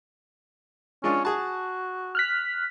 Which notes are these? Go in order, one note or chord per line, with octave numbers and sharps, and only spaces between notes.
G#3 C#4 D4 F4
F#4 G#4 A5
F6 F#6 B6